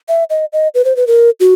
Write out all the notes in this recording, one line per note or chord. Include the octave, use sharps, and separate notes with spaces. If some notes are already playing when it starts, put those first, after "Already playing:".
E5
D#5
D#5
B4
C5
B4
A#4
F#4